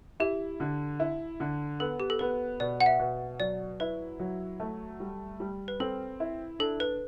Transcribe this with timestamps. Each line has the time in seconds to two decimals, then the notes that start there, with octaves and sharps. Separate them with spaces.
0.20 E4 G4
0.60 D3
1.00 E4
1.40 D3
1.80 B3 A4
2.00 G4
2.10 A4
2.19 B3 B4
2.60 B2 D5
2.80 F#5
2.86 E5
2.99 B2
3.40 F#3 D5
3.80 E4 B4
4.20 F#3
4.60 A3
5.00 G3
5.40 G3
5.68 B4
5.80 C4 A4
6.20 E4
6.59 D4 A4
6.80 B4